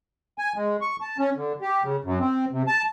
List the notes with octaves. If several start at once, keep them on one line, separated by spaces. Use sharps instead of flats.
G#5
G#3
C#6
A5
C#4
D3
G4
C#3
F#2
C4
C3
A5